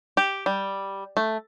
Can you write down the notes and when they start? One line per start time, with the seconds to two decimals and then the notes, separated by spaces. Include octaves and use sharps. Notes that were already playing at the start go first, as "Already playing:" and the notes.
0.17 G4
0.46 G3
1.17 A3